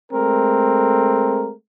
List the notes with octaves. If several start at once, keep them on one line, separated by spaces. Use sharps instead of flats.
G#3 A3 C4 A#4